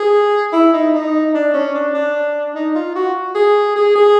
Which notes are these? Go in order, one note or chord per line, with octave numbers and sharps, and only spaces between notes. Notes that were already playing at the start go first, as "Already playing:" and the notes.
Already playing: G#4
E4
D#4
D#4
D4
C#4
D4
D4
D#4
F4
F#4
G#4
G#4
G#4